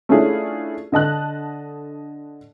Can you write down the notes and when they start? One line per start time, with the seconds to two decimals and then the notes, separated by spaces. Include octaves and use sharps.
0.09 A3 C#4 D4 E4 F4 G#4
0.92 D3 D#5 A5 F#6